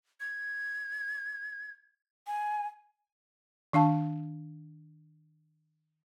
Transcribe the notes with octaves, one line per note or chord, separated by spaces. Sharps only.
G#6
G#5
D#3 D4 F5 A5